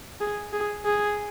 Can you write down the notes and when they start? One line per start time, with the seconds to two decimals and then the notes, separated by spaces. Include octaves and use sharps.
0.21 G#4
0.53 G#4
0.85 G#4